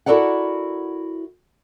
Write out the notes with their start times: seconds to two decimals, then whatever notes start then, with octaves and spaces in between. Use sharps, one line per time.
0.06 E4 F#4 A4 A#4 D5 F#5